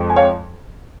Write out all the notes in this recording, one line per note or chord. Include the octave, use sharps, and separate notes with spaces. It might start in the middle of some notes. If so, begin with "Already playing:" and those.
Already playing: F2 F3 G#3
G#5
C#5 F5